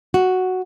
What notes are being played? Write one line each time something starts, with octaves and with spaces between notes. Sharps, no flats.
F#4